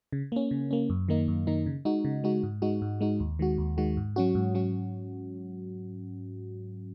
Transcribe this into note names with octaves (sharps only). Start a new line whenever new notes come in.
C#3
A#3 C#4
C#3
A#3 C#4
F#2
D#3 A#3 D#4
F#2
D#3 A#3 D#4
C#3
G#3 D#4 F#4
C#3
G#3 D#4 F#4
G#2
G#3 D#4 F#4
G#2
G#3 D#4 F#4
D#2
D#3 G#3 F#4
D#2
D#3 G#3 F#4
G#2
F#3 C#4 F#4
G#2
F#3 C#4 F#4